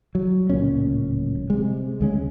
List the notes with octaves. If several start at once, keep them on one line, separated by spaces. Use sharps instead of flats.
F#3
D1 C#2 A#2 C#4
C3 G#3
D2 G#3 C#4